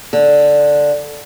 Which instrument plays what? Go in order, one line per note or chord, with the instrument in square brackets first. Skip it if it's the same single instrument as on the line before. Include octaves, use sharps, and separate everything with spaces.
[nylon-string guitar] D3